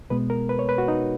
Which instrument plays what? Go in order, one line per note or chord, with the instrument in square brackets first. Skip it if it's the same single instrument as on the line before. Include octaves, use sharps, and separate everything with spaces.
[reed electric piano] B2 G#3 B3 B4
A#4
B4
C#5
B4
F#4
D#4